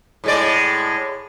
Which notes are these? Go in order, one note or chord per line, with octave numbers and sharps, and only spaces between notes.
A2 G#3 D5